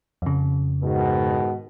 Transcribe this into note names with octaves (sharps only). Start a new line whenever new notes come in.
F2 C#3
G#2 B2 D#3